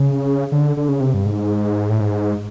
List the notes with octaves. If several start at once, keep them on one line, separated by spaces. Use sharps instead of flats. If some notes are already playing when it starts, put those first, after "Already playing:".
Already playing: C#3
D3
D3
C#3
C3
G2
G#2
A2
G#2